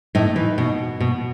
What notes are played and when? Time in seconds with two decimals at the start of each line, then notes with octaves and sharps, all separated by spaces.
0.15 A2 D#4
0.36 E3
0.58 B2
1.00 B2